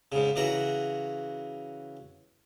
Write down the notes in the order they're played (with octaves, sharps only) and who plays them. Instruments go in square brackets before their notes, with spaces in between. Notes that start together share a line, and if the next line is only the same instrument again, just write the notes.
[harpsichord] G#2 C#3
C#3 E3 F#4 A#5